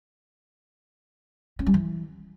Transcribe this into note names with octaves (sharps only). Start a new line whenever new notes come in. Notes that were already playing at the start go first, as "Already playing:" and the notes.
C#4
G3
E3